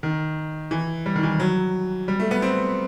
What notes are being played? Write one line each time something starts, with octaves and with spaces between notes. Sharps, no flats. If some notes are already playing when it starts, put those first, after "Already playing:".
D#3
E3
G3
D#3
E3
F#3
G3
A3
B3
C4